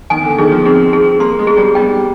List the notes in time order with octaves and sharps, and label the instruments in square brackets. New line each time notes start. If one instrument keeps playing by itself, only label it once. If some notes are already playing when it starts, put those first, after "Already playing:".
[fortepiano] D#3 [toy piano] G#5
[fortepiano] D3
[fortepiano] D#3 [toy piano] G#4
[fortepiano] F3
[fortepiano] C4 [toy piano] G#4
[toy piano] G#4
[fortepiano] A#3 [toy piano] C6
[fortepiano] G#3
[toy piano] G#4
[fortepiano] G3
[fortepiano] G3 [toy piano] G5